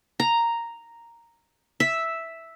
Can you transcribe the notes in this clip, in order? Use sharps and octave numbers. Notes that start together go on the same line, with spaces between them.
A#5
E5